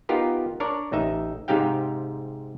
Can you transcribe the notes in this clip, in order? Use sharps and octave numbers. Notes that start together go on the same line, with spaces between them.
B3 D#4 F4 G4 A#4
D4 A#4 C#5 D5
A1 D#4 E5
G#2 C3 D#4 G4 F5 G5